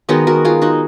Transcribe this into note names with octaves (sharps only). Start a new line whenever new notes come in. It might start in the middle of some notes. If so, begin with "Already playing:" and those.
D#3 G#3 B3 D#4 F#4
F#4 A#4
F4 G#4
D#4 F#4